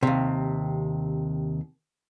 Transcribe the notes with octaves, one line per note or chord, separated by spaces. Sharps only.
D#2 C3